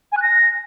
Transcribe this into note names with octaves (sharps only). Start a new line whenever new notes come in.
G#5
F#6
A#6